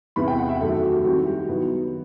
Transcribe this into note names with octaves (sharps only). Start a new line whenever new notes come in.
E2 C3 E3 B3 E4 B5
G5
F#5
E5
F#2 D#3 A3 A4
A4
F#4
G4
D#3 G3 C4 E4 F#4
G4
D#3 F#3 B3 E4